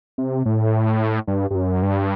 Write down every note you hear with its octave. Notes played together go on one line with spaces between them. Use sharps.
C3
A2
G2
G2
F#2
G2